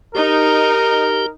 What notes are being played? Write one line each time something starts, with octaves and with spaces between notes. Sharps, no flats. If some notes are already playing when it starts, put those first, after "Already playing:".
D#4 G4 A#4